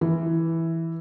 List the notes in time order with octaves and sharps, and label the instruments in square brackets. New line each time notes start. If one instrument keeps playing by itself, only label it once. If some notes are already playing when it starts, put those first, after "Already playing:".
[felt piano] E3